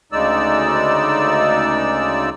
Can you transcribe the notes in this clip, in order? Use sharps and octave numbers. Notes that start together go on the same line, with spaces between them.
D2 C#3 G#3 D#4 D5 E6